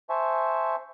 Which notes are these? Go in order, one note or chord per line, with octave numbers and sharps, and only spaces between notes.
C5 E5 G#5 A5 C#6